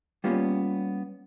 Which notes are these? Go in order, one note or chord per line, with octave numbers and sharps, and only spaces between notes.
G3 A#3 B3 C#4 F4 G4